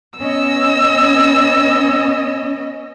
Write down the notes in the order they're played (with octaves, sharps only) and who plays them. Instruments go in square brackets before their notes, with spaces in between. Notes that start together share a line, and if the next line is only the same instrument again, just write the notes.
[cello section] B3 C#4 D#5 [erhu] E6